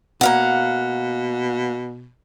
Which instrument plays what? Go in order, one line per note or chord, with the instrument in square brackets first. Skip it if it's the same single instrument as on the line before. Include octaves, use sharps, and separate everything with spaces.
[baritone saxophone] B2 [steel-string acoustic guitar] A#3 F5 F#5